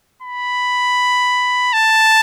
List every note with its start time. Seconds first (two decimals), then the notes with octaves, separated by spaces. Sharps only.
0.22 B5
1.73 A5